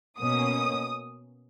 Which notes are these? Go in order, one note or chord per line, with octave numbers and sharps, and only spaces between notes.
B2 A#3 C#4 D#6